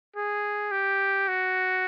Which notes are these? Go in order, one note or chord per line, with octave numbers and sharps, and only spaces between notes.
G#4
G4
F#4